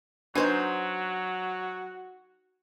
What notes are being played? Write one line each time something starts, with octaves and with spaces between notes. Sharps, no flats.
F#3 D4 D#4 F#4 B4 C5 G#5